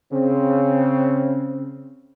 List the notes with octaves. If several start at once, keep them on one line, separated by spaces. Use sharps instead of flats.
C#3 C4